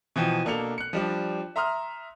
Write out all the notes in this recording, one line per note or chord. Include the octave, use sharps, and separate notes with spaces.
B2 E3 F3 G5
B2 A#3 D4 A4 C#7 F7
F#6 C#7
F3 G3 D4
E5 A#5 C6 D#6 F6